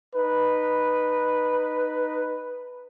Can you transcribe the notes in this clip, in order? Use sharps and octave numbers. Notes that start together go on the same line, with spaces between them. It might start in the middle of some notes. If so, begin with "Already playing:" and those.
D#4 B4